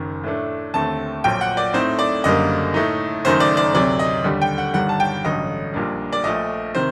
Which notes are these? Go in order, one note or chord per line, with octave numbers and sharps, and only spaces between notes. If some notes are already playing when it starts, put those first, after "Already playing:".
Already playing: F#1 F#2 D#3
A2 A3 D4
D#2 D3 A3 C4 A5
A#1 A#2 F#3 G5
F#5
D5
A2 A3 C4 D#4 C5
D5
F#1 F#2 D3 G3 A#3 D#5
A2 A3 D#4
F#1 F#2 D#3 A3 D#4 C5
D5
D5
D2 C3 F#3 D5
D#5
D#2 D3 G3
G5
F#5
G1 G2 D#3 G3 F#5
A5
G5
A1 G2 D3 F#3 D#5
A#1 A#2 G3 A#3 D4
D5
A#1 A#2 A3 D#5
C3 D#3 C5